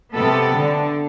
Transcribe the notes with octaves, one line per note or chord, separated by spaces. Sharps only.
C3 B3 A4
D3